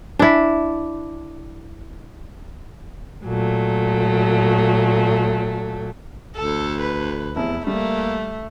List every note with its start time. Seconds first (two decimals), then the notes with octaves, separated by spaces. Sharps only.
0.19 D4 E4
3.25 A#2 F#3 A3
6.36 D2 A4
6.81 B4
7.36 F1 E2 C3 E4
7.67 G3 A3 A#3